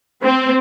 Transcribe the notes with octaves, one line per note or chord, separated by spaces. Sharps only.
C4